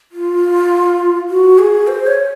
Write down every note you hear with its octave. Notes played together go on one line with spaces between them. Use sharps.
F4
F#4
G#4
C5
C#5